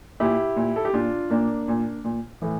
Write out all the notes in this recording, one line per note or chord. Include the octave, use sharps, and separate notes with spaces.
A#2 E4 G4
A#2
A4
G4
A#2 D4 F4
A#2 A#3 D4
A#2
A#2
A2 E3